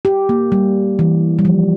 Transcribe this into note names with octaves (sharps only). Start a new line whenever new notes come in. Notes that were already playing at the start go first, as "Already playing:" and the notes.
G4
A#3
G3
E3
G3
F3